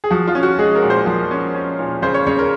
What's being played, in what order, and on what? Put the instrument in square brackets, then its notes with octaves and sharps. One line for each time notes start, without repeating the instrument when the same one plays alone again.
[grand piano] G#4
F3 F#4
F4
C#4
F#4
G#3 G#4
A#4
A#2
C5
F3
C#4
C#4
A#2
C#3 C5
C#5
C#3 C#5
A#4